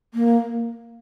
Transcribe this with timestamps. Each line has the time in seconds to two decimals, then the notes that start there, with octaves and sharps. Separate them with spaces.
0.14 A#3